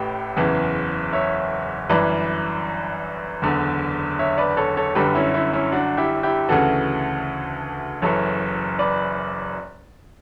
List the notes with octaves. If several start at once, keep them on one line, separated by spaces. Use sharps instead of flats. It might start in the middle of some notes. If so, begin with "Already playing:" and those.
Already playing: A1 A2 G4 B4
F#1 E2 C#3 E3
C#5 E5
G1 F#2 E3 B4 D5
F#1 E2 D3
C#5 E5
B4 D5
A4 C#5
A4 C#5
G1 F#2 D3 G4 B4
C#4 E4
C#4 E4
C#4 E4
D4 F#4
E4 G4
E4 G4
D2 C#3 E3 F#4 A4
F#1 F#2 E3 A4 C#5
B4 D5